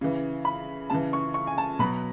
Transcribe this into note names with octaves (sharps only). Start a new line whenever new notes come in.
C#3 E3
B5
C#3 E3 A5
C#6
C#6
G#5
A5
B2 F#3 B5